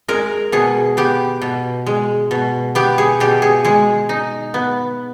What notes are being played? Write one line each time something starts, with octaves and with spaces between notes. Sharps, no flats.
G#3 A#4
B2 G#4
B3 G4
B2
G#3
B2
B3 G4
G#4
B2 G4
G#4
G#3 G#4
D#4
B3